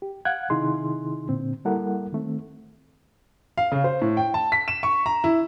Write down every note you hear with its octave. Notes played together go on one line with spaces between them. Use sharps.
G4
F5 F#5 F#6 G#6
C3 D#3 D#4 E4 G#4 C6
A#2 D3 C4
G3 A#3 E4 A4 A#4 F#5
D#3 A3 C4
F5
C#3
C5
A2
G5
A5
B6
E7
C#6
A#5
E4